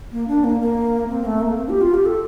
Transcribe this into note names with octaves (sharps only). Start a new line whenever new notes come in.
A#3
D4
A#3
A#3
C4
A3
A#3
C4
G4
F4
G4
A4